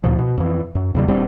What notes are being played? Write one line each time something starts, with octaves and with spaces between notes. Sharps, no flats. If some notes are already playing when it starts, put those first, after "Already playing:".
D2 A#2 F3
B2
F2 E3
F#2
E2 C#3 G3
D#1 G3 C4 D4